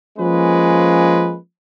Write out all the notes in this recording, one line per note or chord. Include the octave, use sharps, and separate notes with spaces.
F3 G#3 A#3 C#4 B4